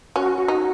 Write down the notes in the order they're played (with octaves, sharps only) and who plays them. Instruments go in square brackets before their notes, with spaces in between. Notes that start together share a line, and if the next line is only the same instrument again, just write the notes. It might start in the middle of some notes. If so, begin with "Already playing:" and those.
[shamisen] C#4 [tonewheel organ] F#4
[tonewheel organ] F#4
[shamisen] D#4